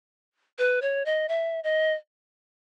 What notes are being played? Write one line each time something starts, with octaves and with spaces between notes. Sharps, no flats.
B4
C#5
D#5
E5
D#5